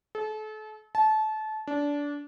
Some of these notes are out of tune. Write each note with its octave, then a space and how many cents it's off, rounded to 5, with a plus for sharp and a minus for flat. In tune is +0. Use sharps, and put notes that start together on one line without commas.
A4 -35
A5 -25
D4 -20